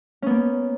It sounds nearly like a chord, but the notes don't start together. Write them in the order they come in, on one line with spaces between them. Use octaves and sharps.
C#4 B3 A#3